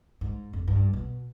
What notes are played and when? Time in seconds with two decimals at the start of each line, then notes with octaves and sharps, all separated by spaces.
0.21 G#2
0.53 F1
0.68 G2
0.94 B2